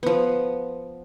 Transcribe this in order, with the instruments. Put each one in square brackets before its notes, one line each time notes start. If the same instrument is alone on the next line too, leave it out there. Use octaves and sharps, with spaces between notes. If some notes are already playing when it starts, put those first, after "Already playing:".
[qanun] F3 B3